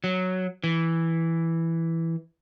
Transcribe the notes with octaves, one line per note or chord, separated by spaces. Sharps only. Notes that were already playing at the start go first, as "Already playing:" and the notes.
F#3
E3